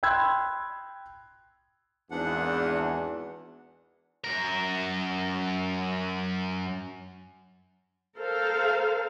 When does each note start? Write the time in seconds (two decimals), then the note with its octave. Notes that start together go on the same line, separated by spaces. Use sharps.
0.03 G5 B5 C6 E6 F#6 G#6
2.11 G#1 E2 D4 F#5
4.24 F#2 A#4
8.18 A4 A#4 C5 F5